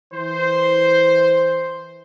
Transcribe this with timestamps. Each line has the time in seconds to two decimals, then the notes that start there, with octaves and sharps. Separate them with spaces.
0.14 E3 C5